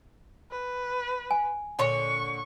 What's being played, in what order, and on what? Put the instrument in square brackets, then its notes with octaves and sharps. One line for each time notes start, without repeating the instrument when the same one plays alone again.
[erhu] B4
[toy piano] G#5
[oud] A#2 D3 C#5 [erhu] C#6